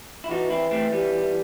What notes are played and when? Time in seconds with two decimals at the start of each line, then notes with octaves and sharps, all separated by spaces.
0.24 E4
0.30 E3 D#4 F#4
0.50 C4 E4
0.71 A3 C4
0.92 G3 B3